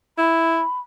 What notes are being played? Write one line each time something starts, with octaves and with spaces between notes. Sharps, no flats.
E4 B5